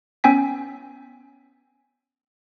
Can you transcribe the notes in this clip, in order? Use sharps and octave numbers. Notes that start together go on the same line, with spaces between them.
B3 C#4 G5 G#5 B6